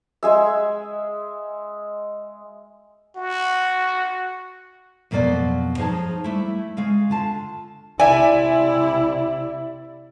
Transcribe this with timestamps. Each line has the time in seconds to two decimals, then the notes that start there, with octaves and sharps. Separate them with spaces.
0.23 G#3 G#4 E5
3.16 F#4
5.11 F2 B2 F#3 A#3 D5
5.77 F3 D#4 G#4 C#5 A5
6.24 G3 A3 E4
6.77 C#3 G#3 F5
7.10 D3 F4 A5
8.00 C3 E4 D5 E5 G#5